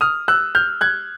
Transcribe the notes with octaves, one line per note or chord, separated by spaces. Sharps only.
D#6 F6
E6 F#6
F6 G6
F#6 G#6